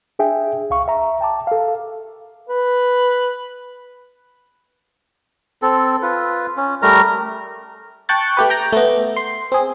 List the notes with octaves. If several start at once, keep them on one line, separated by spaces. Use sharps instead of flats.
D4 G#4 E5 G5 G#5
C#2 F5 C#6
E5 A#5
G5 A5 D6
A4 F5
B4
C4 A4
F4 B4
C#4
G3 A3 A#4 A#5
G5 A5 C#6 F#6 G6 A6
A3 G4 B4
G5 A#5
A3 B3
C6
C4 G#4